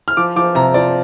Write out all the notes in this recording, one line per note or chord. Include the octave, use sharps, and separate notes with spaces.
F6
F3 D6
F3 D6
C3 A#5
F3 D5